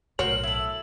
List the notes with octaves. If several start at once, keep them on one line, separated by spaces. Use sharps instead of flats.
B1 A2 F#4 A#4 C5 C#5 F6 F#7
E4 A4